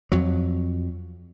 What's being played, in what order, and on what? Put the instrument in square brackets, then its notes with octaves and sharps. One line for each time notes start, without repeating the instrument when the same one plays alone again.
[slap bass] F2 F#3